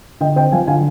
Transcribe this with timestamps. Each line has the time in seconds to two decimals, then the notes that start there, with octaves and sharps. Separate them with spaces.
0.21 D3 D#5 G5
0.36 C4 D#5 G5
0.52 F3 F5 G#5
0.67 D3 F5 G#5